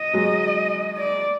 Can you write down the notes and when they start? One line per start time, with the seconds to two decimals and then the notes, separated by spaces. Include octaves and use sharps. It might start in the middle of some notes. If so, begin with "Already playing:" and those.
Already playing: D#5
0.14 F#3 G#3
0.97 D5